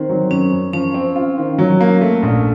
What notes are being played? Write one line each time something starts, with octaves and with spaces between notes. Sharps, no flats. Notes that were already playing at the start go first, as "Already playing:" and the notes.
Already playing: D#3 C4 C5
F#3
F#2 C#4
F#2
F3 C#4
C4
F4
D#3
F#3
A#3
A3
A#1